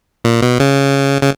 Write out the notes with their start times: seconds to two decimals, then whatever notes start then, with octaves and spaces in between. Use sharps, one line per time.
0.24 A#2
0.42 B2
0.60 C#3
1.21 C#3